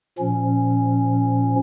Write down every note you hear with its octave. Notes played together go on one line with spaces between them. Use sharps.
A#2 F3 C#4